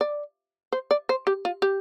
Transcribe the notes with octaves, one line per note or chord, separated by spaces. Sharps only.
D5
C5
D5
C5
G4
F4
G4